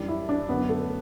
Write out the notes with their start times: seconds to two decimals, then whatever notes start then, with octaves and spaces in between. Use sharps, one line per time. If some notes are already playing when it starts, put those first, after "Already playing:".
Already playing: F#2 E3 G3 D4
0.08 E4
0.29 D4
0.49 F#2 D3 F#3 B3
0.69 A3